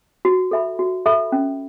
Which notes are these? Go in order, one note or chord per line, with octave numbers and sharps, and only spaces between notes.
F#4
A4 E5 B5
F#4
A4 E5 B5
C#4